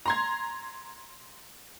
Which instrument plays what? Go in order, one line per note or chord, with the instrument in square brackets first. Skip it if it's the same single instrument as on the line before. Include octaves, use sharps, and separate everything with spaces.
[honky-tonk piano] A#5 C6 G#6